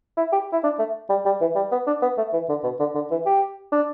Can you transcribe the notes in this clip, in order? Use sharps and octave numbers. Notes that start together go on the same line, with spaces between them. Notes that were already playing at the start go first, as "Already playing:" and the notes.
E4
G4
E4
D4
A3
G3
G3
E3
G3
B3
D4
B3
A3
E3
D3
B2
D3
D3
E3
G4
D4